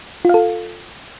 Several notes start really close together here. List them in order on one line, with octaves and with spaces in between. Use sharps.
F4 F5 A4